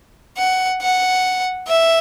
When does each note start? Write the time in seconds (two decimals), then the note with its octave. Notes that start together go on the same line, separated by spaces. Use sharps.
0.37 F#5
0.82 F#5
1.68 E5